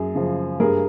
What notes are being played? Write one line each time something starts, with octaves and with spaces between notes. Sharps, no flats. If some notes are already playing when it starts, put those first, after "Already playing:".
Already playing: F#2 G#4
C#3 F3
G2 G#4 A#4